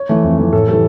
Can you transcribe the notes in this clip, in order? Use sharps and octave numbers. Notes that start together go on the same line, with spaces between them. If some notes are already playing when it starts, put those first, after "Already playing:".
Already playing: C#5
E3 A3
F2
E3 A3
A2 A4
E3 G3 A4